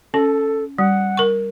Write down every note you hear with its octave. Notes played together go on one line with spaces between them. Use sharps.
C#4 A4
G3 F#5
A#4 C#6